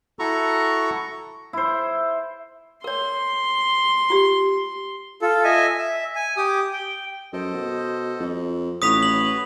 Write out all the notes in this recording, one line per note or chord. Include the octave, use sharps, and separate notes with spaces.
E4 F#4 A4 A#5 C#6
E4 C5
A#4 C#5 C6
F4 G4
F4 A4
D#5 E5 G#5
E5
G#5
G4 D#6
G5
F#2 A4 C5 D#5
B2
F2
A1 F#4 B4 C#5 D#6 B6 F7
F#7